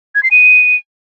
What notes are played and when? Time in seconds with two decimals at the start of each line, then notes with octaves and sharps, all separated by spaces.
0.15 G#6
0.23 C7
0.31 D#7